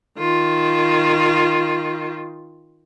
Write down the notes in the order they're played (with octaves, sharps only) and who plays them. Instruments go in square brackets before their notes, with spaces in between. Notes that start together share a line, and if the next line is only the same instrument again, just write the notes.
[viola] D#3 F4